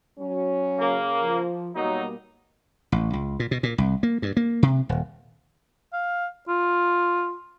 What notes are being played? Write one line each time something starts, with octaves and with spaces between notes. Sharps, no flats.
F#3 C#4
C#3 A#3
F3
B2 F#3 G3 A#3 D#4
A1
C#2
A#2
B2
A#2
C2
A#3
G2
A#3
C3
D#1
F5
F4